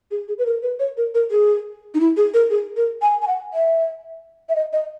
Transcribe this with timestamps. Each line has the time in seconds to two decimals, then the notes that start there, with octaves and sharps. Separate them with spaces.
0.11 G#4
0.28 G#4
0.38 B4
0.46 A#4
0.63 B4
0.79 C#5
0.97 A#4
1.15 A#4
1.31 G#4
1.94 D#4
2.00 E4
2.17 G#4
2.34 A#4
2.51 G#4
2.77 A#4
3.02 G#5
3.22 G#5
3.28 F#5
3.54 E5
4.49 E5
4.56 D#5
4.73 D#5